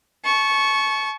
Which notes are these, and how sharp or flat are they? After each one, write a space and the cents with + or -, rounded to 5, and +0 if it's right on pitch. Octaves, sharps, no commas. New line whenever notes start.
A5 -30 C#6 +0